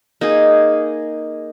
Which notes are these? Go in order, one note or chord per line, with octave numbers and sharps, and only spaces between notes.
A#3 D#4 G#4